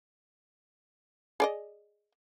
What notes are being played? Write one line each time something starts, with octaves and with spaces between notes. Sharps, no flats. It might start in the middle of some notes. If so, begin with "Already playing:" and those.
G#4 D5 D#5